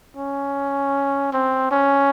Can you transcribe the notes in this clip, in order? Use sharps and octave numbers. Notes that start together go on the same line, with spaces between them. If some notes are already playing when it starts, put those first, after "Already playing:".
C#4
C4
C#4